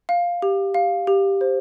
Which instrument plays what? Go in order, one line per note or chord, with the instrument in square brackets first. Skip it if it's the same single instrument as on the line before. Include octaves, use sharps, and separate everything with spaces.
[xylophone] F5
G4
F5
G4
C5